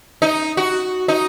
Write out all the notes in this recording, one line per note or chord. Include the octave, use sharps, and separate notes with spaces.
D#4
F#4
D#4